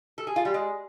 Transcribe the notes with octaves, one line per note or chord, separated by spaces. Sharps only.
A4
G#4
F4
G3
G#3